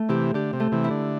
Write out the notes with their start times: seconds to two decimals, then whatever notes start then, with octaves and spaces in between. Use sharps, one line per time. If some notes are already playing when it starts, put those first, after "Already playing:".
Already playing: A3
0.09 C3 E3 G4
0.34 D3 G4
0.53 C3
0.60 A3
0.72 C3 E3
0.84 E4
0.91 D3